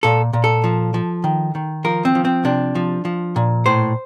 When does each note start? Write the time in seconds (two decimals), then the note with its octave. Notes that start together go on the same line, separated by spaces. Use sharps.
0.03 A#2 A4
0.33 A#2
0.44 A4
0.64 F3
0.94 F3
1.24 D#3
1.55 D#3
1.85 F3 A#4
2.05 C4
2.15 F3
2.25 C4
2.45 C3 D4
2.75 F3
3.05 F3
3.36 A#2
3.66 A2 C5